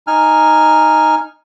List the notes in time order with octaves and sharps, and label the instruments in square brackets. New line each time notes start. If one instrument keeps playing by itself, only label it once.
[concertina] D#4 G#5 F6